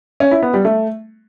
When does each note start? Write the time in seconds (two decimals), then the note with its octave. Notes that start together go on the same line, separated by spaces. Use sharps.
0.20 C#4
0.31 E4
0.42 B3
0.54 G3
0.65 A3